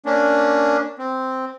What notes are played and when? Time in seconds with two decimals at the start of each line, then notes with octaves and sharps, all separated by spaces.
0.06 A#3 C#4 D4
0.99 C4